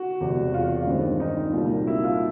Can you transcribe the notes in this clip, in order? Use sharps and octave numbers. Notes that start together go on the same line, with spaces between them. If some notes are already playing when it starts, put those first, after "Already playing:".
Already playing: F#4
E1 E2 C3
F4
G2 D#3 G#3 C4
D#4
C2 A#2 F#3 A#3
E4
F4